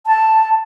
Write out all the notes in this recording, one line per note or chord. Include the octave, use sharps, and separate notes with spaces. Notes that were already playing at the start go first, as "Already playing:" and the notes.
A5